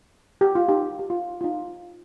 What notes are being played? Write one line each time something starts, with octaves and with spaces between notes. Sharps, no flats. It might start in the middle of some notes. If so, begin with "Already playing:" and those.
G4
F4
D#4 G4
G4
F4
F4
D#4